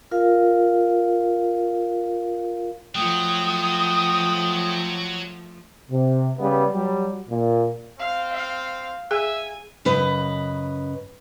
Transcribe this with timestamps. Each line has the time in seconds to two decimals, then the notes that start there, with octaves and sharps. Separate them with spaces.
0.11 F4 A#4 F5
2.95 F3 F#3 A3 G5 D#6
5.90 C3
6.38 C#3 G3 B3
6.73 F#3 G3
7.29 A#2
7.99 C4 F5
8.34 F5
9.11 G#4 E5 G#5
9.85 F#2 C#3 B4 D#5